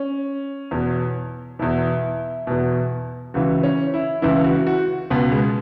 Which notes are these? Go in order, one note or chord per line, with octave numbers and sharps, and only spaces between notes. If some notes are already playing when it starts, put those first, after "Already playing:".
Already playing: C#4
E2 B2
E2 B2 E4
E2 B2
C#2 C#3 E3 F#4
C#4
E4
C#2 C#3 E3 E4
F#4
F#4
C#2 B2 B3
G#3